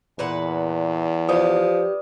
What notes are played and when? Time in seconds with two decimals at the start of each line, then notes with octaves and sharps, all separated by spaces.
0.19 E2 A#2 B4 F#5
1.29 F3 G4 B4 D5 D#6